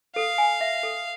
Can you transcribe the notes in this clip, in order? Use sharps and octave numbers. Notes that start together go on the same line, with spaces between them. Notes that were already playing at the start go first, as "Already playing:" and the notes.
A4 F5
G#5
E5
A4